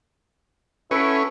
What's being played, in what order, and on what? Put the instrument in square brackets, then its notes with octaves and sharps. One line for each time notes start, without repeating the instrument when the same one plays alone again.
[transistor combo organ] C#4 [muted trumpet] E4 [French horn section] F#4 A4 [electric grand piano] B4 C#7 D7